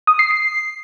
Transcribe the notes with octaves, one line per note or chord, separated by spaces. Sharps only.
D#6
C7
C7